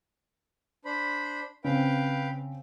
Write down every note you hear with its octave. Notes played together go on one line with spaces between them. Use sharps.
D4 C5 B5
C#3 C4 B4 F5 G5